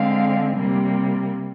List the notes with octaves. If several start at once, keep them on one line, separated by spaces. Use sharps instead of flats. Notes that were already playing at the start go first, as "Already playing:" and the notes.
Already playing: D3 G#3 C4 F5
C3 G3 A#3